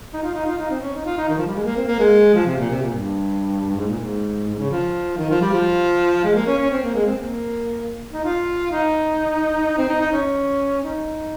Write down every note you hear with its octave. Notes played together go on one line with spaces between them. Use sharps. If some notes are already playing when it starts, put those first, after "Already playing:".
D#4
F4
D#4
F4
D#4
C4
C#4
D#4
F4
D#4
D#3
F3
G3
G#3
A#3
C4
A#3
G#3
F3
C3
A#2
C3
A#2
G2
G#2
A#2
G#2
G#2
C#3
F3
D#3
F3
G3
F3
G#3
A#3
C#4
C#4
C4
A#3
G#3
C4
A#3
D#4
F4
D#4
C4
D#4
D#4
C#4
D#4